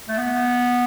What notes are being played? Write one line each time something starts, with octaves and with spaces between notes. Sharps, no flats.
A3
B3